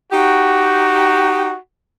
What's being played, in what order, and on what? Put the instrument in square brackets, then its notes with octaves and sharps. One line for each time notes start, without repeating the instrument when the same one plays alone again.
[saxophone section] D#4 G4 [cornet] F#4